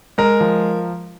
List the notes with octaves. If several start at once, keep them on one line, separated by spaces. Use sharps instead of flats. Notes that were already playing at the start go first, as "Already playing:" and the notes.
G#3 A#4
F3